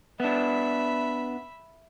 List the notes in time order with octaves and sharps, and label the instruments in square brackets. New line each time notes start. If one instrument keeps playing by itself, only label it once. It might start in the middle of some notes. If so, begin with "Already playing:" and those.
[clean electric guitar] B3 D4 [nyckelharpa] E5 B5